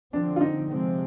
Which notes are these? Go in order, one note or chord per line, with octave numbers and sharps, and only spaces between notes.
D3 F3 C4 D4
F4
D#4
C3 F3 G#3 C4